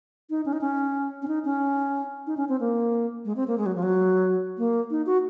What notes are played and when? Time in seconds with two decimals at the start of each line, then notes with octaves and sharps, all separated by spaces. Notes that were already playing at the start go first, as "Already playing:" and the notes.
0.30 D#4
0.46 C#4
0.53 D#4
0.61 C#4
1.22 C#4
1.28 D#4
1.45 C#4
2.27 D#4
2.37 C#4
2.49 C4
2.60 A#3
3.25 G#3
3.36 C4
3.48 A#3
3.58 G#3
3.66 F#3
3.75 F3
3.83 F#3
4.58 A#3
4.91 D#4
5.06 F#4